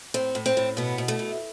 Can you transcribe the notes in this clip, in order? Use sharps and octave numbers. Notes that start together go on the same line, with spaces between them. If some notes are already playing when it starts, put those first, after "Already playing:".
A2 C4
A2
C4
A2
B2 B3
B2
A3
B2